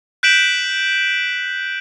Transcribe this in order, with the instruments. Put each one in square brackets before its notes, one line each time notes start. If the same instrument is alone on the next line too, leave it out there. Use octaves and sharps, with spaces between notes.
[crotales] F#6 G6 B6 D7 E7 F#7